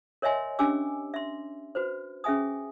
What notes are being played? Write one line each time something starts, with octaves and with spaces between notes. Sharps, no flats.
A#4 C#5 D#5 E5 G#5 C6
C#4 D4 G4 G#5 D6 E6
E5 C6
F#4 B4 C5
C#4 G#4 E5 G#5 D#6